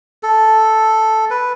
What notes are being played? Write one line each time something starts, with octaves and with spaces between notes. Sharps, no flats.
A4
B4